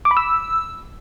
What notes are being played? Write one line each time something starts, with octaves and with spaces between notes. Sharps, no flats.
D6
B5
E6